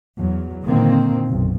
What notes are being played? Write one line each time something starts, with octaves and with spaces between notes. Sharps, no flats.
E2 F#3
A#2 D3 D#3 A#3 C4
F#1 B1